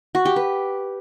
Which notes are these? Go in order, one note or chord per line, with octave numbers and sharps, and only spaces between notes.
F#4
G4
B4